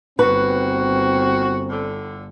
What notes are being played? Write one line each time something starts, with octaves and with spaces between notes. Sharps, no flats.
G1 D#2 C4 F#4 B4
A2 D3